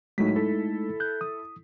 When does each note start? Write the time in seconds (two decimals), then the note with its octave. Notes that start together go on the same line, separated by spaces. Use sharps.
0.18 A2 F#3 G#3 A3 D#4 B6
0.35 E4 A4
1.00 F#6 G6
1.21 D#6